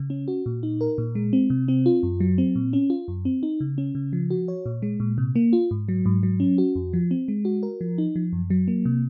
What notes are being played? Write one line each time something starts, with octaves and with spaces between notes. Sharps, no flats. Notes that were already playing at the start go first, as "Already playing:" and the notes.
Already playing: C#3
C#4
F#4
A#2
D#4
A#4
A#2
G#3
C4
C3
C4
F4
F#2
F#3
C4
A#2
C#4
F4
F#2
C4
D#4
C#3
C#4
C#3
F3
F#4
C#5
A#2
G#3
A#2
C3
A#3
F4
G#2
F#3
G#2
F#3
C#4
F#4
F2
F3
C4
G#3
F#4
A#4
F3
D#4
F3
F#2
F#3
A#3
C3